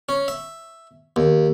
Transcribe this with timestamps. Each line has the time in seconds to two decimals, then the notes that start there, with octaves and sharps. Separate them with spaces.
0.09 C#4
0.28 E5
1.16 D#2